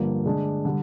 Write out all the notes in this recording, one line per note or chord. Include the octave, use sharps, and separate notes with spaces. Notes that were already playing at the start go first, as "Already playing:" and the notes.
Already playing: G2 D3 F3 A#3
D3 G#3 D4
D3 G3